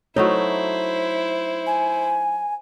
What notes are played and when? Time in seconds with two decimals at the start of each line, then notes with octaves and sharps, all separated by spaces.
0.16 F#3 A3 D#4 E4 C5 C#5
1.67 G#5